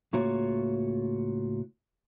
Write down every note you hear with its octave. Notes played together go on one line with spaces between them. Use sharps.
C#2 A2 A#3 F4 F#4 C#5